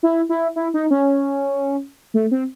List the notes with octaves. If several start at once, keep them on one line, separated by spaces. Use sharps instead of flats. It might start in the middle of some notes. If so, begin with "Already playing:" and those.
E4
E4
E4
D#4
C#4
A3
C4